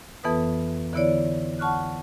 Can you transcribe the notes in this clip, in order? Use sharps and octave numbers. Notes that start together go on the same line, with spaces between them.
F2 E3 B3 A4 B4 D#6
D3 E3 B3 E4 C#5 D5
F#5 A5 C#6 F6 F#6